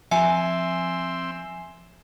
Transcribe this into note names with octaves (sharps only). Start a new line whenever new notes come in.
F3 C4 E5 G#5 A#5 C6 E6 C#7